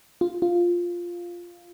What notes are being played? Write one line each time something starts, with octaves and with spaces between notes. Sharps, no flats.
F4
F4